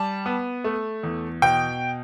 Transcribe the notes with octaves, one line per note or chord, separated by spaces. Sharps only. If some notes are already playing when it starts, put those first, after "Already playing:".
Already playing: G3 A5
B3
A3
E2
B2 G5